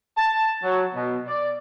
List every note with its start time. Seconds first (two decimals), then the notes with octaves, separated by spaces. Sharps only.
0.17 A5
0.63 F#3
0.95 B2
1.27 D5